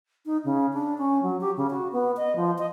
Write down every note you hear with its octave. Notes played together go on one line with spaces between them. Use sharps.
D#4
C#3
D4
C#4
F#3
G4
C#3
F#4
B3
D#5
F3
D#5